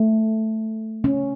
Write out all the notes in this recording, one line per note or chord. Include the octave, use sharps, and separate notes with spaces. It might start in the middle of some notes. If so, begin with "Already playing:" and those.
Already playing: A3
C#4